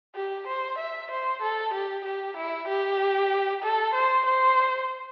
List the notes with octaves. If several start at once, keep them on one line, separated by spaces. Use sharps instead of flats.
G4
C5
E5
C5
A4
G4
G4
E4
G4
A4
C5
C5